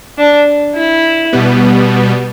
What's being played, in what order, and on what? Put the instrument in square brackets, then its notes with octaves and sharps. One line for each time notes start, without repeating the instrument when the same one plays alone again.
[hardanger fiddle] D4
E4
[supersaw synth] B2 G3 B3